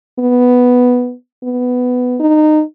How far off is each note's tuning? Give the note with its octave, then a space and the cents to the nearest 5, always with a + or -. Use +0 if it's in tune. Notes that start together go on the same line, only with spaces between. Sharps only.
B3 +0
B3 +10
D#4 -20